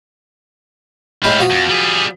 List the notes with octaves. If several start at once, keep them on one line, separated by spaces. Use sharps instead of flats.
A2 G#3 G4 F5 B5
F3 F#4 D#6
F2
G3 G#4